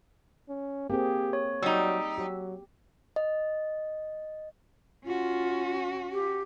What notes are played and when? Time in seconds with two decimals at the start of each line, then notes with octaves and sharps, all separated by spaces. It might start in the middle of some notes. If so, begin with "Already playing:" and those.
0.49 C#4
0.90 A#3 C4 G4 G#4
1.33 C#5
1.62 F#3 G3 D#4 E6
2.18 F#3 G4
3.16 D#5
5.05 C#4 F4 F#4
6.12 G4